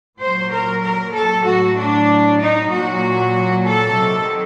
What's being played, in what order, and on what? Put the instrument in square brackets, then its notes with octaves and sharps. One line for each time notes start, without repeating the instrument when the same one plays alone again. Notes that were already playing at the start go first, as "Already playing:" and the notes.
[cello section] A#2 F#3 C5
A#4
A#4
A4
A2 F#3 F#4
D4
D#4
A#2 F#3 F#4
A4
C3 D#3 F#3